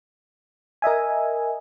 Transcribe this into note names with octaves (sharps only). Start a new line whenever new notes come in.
A#4 D#5 E5 G#5